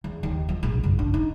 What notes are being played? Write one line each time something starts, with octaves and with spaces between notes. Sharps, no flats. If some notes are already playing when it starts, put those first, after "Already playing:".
E2
D#2
F3
A#1
F#1
D4
D#4